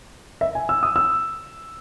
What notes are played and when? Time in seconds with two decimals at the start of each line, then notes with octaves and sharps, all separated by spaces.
0.41 E5
0.55 G#5
0.69 E6
0.83 D#6
0.96 E6